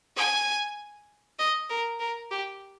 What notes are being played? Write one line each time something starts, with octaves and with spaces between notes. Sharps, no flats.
G#5
D#5
A#4
A#4
G4